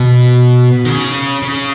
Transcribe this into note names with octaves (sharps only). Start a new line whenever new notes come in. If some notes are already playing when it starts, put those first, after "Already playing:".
Already playing: B2
D#3
C#3
C#3